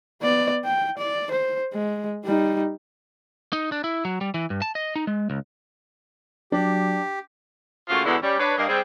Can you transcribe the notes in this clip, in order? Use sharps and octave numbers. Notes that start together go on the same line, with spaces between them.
B3 D5
G5
D5
C5
G#3
G3 D#4
D#4
D4
E4
F#3
G3
E3
G2
A5
D#5
D#4
G#3
C#2
F#3 D4 G4
C#3 A3 A#3 F4 F#4
E2 B2 D3 G#3 B3 E4
G3 C#4
D4 B4 C#5
G2 A#3 D#5
G3 C4 G#4